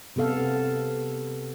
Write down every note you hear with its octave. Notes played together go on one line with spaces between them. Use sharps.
C3 B3 A4 F5